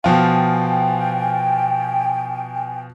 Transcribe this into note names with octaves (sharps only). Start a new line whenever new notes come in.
B2 F3 F4 G5 G#5